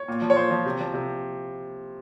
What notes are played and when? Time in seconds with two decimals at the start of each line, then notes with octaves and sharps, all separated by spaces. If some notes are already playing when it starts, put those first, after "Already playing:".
Already playing: C#5
0.08 A#2
0.22 F3
0.30 C#5
0.36 A#2 C5
0.51 F3
0.66 C3
0.80 F3
0.94 C3